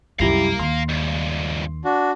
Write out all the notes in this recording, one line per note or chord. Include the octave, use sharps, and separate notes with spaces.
C2 F#2 G3 E4 G4 F5 A#5
D#2 C6
C#2 G2
D4 F#4